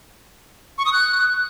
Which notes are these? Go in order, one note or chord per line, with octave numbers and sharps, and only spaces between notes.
C#6
D#6
F#6